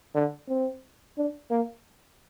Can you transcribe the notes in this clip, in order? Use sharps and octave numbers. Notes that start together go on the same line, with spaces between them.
D3
C4
D4
A#3